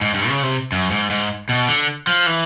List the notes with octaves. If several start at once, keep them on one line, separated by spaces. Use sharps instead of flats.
G#2
G2
C#3
C3
F#2
G#2
G#2
B2
D3
F3
E3